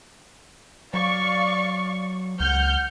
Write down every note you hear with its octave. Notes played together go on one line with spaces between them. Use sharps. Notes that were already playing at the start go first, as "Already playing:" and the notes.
F#3 D5 F5 C#6
C#2 F#5 F6 G6